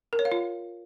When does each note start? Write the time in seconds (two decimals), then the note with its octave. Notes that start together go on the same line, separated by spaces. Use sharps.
0.13 A#4
0.19 C#5
0.25 F5
0.32 F4